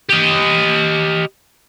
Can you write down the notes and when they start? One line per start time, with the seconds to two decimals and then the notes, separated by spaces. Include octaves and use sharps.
0.09 G4 D#5